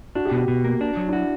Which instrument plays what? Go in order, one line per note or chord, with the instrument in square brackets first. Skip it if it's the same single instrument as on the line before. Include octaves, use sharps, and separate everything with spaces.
[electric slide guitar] D4 [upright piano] F#4
[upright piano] G4
[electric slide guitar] B2 [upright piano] F#4
[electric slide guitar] B2
A#3
D4
F#3
[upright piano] D4
[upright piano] E4 [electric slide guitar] F#4